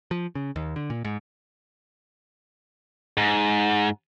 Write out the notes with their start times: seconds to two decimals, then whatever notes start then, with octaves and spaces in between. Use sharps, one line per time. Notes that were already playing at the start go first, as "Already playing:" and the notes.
0.11 F3
0.35 C#3
0.56 D#2
0.76 D3
0.90 A#2
1.05 G#2
3.17 G#2